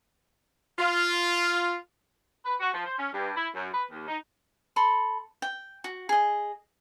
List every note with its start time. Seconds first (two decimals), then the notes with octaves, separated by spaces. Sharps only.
0.79 F4
2.44 B4
2.60 F#4
2.74 F3
2.86 C5
2.97 C#4
3.13 G2
3.36 E4
3.54 F#2
3.73 B4
3.91 D#2
4.08 D#4
4.76 A4 B5 C6
5.42 G5
5.84 F#4
6.09 G#4 D#5